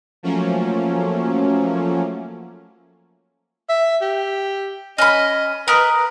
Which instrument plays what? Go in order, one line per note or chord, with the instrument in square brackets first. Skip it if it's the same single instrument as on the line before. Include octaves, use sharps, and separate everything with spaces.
[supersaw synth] F3 F#3 A3 A#3 C#4
[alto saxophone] E5
G4
[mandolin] C#4 B5 [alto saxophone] D#5
[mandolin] A#4 D#5 [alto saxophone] B4